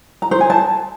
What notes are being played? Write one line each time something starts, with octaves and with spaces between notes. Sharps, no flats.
A#5
C5
G#5
A5